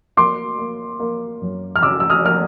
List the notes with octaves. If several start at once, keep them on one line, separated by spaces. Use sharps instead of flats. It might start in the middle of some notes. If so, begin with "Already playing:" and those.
A#3 C6 D6
A#3
A#3
F#2
F6
C#3 D6 E6
E6
D#6 F6
A#3 F6